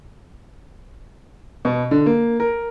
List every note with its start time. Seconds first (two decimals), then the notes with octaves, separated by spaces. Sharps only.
1.65 B2
1.91 D3
2.06 A#3
2.40 A#4